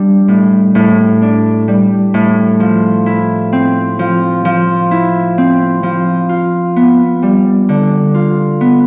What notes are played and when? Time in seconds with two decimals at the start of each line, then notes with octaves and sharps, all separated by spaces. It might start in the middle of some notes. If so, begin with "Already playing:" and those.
Already playing: G3 D4
0.28 A2
0.75 A2
1.22 D4
1.68 G3
2.14 A2
2.60 F3
3.06 E4
3.53 C4
3.99 F3
4.45 F3
4.91 E4
5.38 C4
5.83 F3
6.29 F4
6.76 B3
7.22 G3
7.69 D3
8.14 F4
8.61 B3